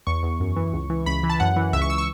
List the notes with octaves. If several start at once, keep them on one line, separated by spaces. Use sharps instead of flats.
E2 C#6
E2
F#2
E3
C#2
E3
C#2 B5
E3
A5
F#2 F#5
E3
C#2 E5
C#6
E6
C#6